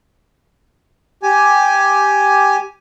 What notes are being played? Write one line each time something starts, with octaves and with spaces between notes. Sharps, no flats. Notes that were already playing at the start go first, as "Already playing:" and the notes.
G4 G#5